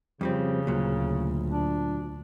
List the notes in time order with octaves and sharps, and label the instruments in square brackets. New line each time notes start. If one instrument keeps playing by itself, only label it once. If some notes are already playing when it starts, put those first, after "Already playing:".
[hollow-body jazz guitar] F2 G3 C4 [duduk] C#3
[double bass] D2 [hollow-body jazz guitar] A#2 F#3
[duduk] D4